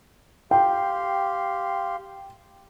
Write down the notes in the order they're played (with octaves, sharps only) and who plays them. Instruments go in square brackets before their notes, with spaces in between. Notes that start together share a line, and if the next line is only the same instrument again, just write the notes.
[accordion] G4 F5 C6 [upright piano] G5